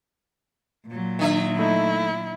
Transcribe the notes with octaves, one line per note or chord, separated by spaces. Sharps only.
A#2 F#3
D#3 D4 E5
A3 D#4 E4